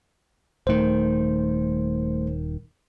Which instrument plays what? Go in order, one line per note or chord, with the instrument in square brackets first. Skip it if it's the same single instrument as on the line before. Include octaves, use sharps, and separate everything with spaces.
[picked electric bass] D#1 D#3 [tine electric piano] A3 C5